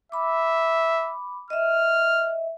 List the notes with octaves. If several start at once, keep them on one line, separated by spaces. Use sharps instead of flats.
E5 B5 D6
D#5 E5 F6